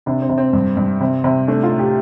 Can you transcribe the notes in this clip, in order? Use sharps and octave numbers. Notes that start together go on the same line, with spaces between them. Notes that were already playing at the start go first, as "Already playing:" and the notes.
C3 D4
C4
C3
C4
G2
G2
C3
C3
A3 D4
F4
A2
G4